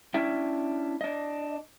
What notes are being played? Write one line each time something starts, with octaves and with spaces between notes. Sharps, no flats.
C#4 D4 E4 E5 G5
D4 D#5